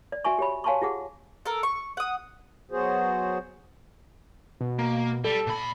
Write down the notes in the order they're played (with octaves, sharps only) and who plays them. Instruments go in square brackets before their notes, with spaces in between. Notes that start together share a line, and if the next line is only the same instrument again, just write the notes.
[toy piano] D5
F#4 E5 G#5 C#6
G4 C#5 B5
C#5 F5 G#5 A5 C6 C#6
F4 G4 G#4 F#5
[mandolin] A4 A#4
C#6
F#5 D#6
[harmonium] F#3 B3 F#4 G#4 C5
[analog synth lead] B2
[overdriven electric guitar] A#3
[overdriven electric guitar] G3 [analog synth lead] A4
[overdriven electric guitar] A#2 B5